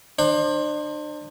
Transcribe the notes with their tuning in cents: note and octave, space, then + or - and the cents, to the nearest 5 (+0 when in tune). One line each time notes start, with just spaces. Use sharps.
D4 +40 C5 +25